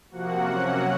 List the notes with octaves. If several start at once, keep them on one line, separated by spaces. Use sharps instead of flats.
C3 F3 A#3 F#4 F#5
C3 F#3 A#3 C#4 F#4 F#5